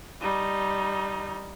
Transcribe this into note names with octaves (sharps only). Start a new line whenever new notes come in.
G3 D#4